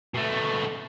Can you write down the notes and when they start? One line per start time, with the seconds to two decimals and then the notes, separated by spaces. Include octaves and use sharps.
0.14 B2 A3